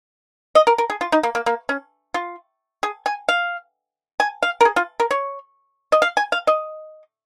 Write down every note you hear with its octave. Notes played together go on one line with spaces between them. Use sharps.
D#5
A#4
A#4
G#4
F4
D#4
A#3
A#3
A#3
C#4
F4
G#4
G#5
F5
G#5
F5
A#4
G#4
F4
A#4
C#5
D#5
F5
G#5
F5
D#5